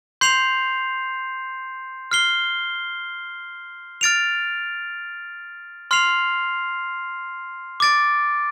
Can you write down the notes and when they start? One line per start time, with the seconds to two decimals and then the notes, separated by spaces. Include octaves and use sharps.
0.21 C6 G6 C7 F7
2.11 F6 C7 G7
4.01 F6 A6 D7 F7
5.91 C6 F6 C7 F7
7.80 D6 A6 D7